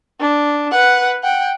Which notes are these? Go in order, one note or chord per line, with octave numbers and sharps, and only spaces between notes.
D4
B4 F#5
F#5 G5